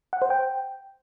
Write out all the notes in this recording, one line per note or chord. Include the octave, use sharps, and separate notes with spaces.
F#5
C5
G5